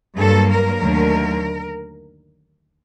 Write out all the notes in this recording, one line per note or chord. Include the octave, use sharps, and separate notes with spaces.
G2 F#3 A#3 A4
A#4
D#2 D3 F#3 A3